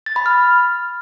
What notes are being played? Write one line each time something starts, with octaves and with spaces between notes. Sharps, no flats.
A6
B5
F6